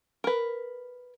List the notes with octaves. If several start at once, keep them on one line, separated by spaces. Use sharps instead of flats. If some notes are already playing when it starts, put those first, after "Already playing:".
A#4 B4